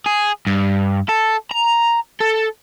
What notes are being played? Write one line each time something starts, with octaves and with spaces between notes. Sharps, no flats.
G#4
G2
A4
A#5
A4